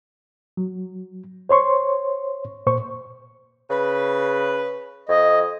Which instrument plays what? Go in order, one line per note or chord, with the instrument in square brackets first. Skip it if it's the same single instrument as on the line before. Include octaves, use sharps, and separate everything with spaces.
[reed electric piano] F#3
C5 C#5 C6 C#6
A#2 C5 C#6
[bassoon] C#3 [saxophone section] B4
[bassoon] F2 [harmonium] D#5